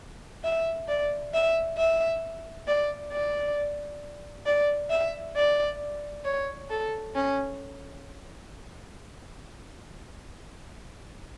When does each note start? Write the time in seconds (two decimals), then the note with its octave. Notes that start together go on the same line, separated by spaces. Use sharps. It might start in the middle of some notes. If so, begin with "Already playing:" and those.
0.44 E5
0.89 D5
1.34 E5
1.78 E5
2.68 D5
3.12 D5
4.46 D5
4.91 E5
5.36 D5
6.25 C#5
6.70 A4
7.15 C#4